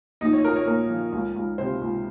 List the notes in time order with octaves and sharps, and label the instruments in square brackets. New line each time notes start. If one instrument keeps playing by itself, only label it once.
[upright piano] A#1 D#4
C#5
A#2 A#4
C#5
A#2 A#4
F3
C#2
C#2
C3 C5
C#2